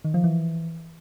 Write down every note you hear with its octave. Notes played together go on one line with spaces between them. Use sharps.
D#3
F3
E3